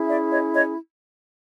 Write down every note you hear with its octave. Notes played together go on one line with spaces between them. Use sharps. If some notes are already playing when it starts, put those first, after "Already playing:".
Already playing: C#4 E4 G#4
D5 E5
C#5 D#5
C#5 D#5